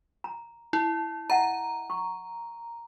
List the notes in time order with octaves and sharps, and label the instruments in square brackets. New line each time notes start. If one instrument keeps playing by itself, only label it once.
[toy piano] A#5
[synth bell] E4
[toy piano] D#5 E5 F#5 [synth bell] A#5
[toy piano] C#6